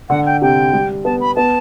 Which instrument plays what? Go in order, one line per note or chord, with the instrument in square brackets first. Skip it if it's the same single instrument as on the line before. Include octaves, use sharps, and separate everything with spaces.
[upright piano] D3 [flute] F#5
[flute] G5
[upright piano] C3 [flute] G5
[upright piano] G3
[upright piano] B3 [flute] A5
[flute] B5
[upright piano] B3 [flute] A5